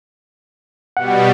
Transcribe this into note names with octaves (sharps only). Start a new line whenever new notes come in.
B2 G3 F#5